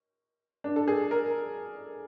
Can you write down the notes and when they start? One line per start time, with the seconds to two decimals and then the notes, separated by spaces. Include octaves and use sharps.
0.64 D4
0.76 A4
0.88 G#4
1.11 A#4